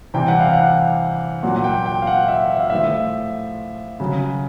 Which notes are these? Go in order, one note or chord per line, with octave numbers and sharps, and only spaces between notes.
C3 E3 G3 G5
F#5
F5
F#5
A#2 F#3 F#5
F#5
G5
G5
F5
F#5
E5
E5
F5
A2 F3 E5
C#3 F#3